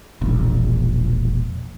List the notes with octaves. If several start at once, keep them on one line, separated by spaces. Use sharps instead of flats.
E1 A#1